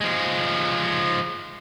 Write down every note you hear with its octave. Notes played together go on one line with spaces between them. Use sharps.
F3 G#3